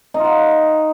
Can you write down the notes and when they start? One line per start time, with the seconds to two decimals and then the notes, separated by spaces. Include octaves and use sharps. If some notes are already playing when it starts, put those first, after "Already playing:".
0.14 D#4
0.19 F4
0.24 F#5